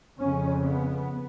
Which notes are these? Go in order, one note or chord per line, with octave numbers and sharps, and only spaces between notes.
F2 C#3 C#4
B3